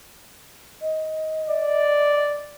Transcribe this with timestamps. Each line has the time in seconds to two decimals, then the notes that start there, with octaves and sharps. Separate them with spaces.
0.82 D#5
1.50 D5